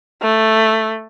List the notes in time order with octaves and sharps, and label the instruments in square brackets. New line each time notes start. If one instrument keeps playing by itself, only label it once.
[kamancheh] A3